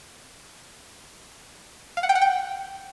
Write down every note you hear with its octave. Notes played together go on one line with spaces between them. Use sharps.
F5
F#5
G5
F#5
G5